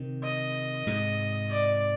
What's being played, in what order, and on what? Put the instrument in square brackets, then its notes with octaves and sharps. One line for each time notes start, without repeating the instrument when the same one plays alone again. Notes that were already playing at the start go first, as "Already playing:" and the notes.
Already playing: [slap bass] C3 D#3
[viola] D#5
[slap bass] G#2 C3
[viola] D5